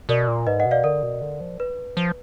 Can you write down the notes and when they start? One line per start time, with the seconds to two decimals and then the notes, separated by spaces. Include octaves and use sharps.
0.09 B2 A#4 D5
0.28 A#2
0.47 G#2 B4 D#5
0.60 D#5 F#5
0.66 B2
0.71 D5 F5
0.84 D3 A#4 D5
1.03 B2
1.22 D3
1.41 F3
1.60 B4
1.97 F3